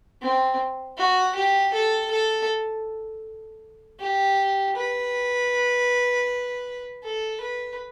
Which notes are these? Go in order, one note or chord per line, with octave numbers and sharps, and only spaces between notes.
C4
F#4
G4
A4
A4
G4
B4
A4
B4